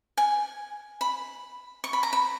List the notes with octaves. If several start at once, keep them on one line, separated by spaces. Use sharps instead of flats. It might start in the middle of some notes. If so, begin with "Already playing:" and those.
G#5
B5
C#6
B5
A#5
B5